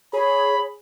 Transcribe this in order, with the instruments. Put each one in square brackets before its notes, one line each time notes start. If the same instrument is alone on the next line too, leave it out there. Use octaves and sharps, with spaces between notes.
[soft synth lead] G#4 [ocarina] C#5 [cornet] B5